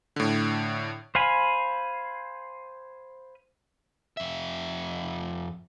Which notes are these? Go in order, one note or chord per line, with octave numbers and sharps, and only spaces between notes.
A2 D3
C5 F5 G#5 B5
F2 E5